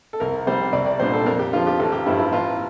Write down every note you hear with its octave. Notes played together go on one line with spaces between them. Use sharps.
A4
C2 A#4
C3 G3 C4 C5
C2 D5
D5
A#2 G3 D4 C5
A4
F2 A#4
G4
D3 F3 F4
G4
A1 A4
G4
G2 F3 E4
E4
A1 F4